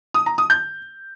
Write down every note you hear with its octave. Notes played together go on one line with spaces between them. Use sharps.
D#6
A#5
D#6
G6